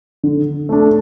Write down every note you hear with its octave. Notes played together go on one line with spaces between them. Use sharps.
D3
A3 D4